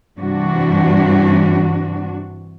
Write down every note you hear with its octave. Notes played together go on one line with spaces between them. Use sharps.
G2 C3 E3 D4 F#4